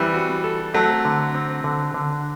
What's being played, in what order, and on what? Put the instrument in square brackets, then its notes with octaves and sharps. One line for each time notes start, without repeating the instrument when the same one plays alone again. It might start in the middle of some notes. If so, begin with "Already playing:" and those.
Already playing: [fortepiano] E3 G3 [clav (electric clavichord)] C4
[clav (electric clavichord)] F#4
A4
[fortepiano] F#3 A3 [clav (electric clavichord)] C4
[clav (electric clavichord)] D3
C4
D3
D3